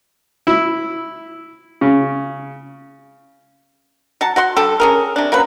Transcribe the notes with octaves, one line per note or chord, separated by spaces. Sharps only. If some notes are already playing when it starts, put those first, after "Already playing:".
E4
C#3
F#3 F#5 A5
F#4 F#5 C6
D3 G3 G4 A4
C#4 G#4 A#4
C3 D4
F#3 A#3 C#4 B4